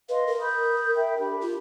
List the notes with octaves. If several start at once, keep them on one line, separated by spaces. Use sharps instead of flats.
B4 D#5 F5 C6
A#4
B5 D#6 G6
E5 G5 B5
D4 G4 B5
F4